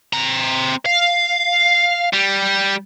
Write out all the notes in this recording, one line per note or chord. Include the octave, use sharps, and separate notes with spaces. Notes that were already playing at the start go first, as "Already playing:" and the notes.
C4 A#5
F5
G3